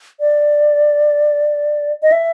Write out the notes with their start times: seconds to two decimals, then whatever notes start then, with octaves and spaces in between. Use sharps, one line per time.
0.20 D5
2.03 D#5
2.12 E5